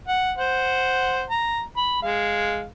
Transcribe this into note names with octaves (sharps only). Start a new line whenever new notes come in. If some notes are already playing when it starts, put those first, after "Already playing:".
F#5
C5 F#5
A#5
B5
G#3 F5